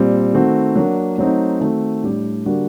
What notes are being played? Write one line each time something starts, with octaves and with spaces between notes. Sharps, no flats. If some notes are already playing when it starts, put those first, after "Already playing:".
Already playing: A#2 G3 C4
D#3 A3 C4 F#4
F#3 A#3 D4
F#3 A3 C4 D#4
D#3 A3 C4 F#4
A2 G3 D4 G4
D3 G3 A#3 D4 F#4